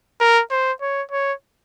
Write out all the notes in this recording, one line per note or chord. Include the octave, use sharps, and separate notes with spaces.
A#4
C5
C#5
C#5